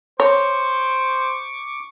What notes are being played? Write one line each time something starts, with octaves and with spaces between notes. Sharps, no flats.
C5 C#5 C#6 D6